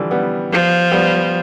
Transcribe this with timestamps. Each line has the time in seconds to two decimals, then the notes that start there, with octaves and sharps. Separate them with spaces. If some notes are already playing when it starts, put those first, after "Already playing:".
Already playing: D3 E3 F3 G3
0.11 G3 B3
0.52 F3
0.92 G3 B3